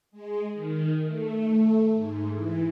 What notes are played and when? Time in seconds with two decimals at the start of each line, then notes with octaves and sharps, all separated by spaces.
0.11 G#3
0.53 D#3
1.04 A3
1.92 G#2
2.32 E3